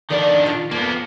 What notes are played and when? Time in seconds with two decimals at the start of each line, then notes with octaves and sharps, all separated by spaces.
0.10 D3 D#3 D4 D5 F5
0.46 F4
0.71 F2 A#3 B3